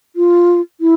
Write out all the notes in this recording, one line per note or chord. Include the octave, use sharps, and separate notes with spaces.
F4
E4